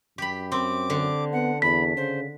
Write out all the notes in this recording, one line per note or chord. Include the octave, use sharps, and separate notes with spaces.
F#2 G4 B5
C4 D6
D3
B3 F#5
E2 B5 B6
C#3 C5